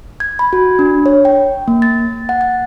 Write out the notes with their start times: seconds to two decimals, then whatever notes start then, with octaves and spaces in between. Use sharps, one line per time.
0.20 G#6
0.39 B5
0.53 F#4
0.79 D4
1.06 C#5
1.25 G5
1.68 A#3
1.82 A6
2.29 F#5
2.41 A6